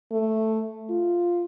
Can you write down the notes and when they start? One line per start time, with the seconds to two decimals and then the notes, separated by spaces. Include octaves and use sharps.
0.11 A3
0.89 F4